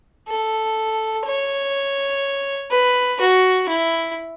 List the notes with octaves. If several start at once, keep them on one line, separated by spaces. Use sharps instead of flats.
A4
C#5
B4
F#4
E4